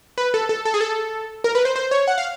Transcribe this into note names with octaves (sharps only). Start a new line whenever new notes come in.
B4
A4
A4
A4
G#4
A4
A#4
B4
C5
C5
C#5
F#5
F5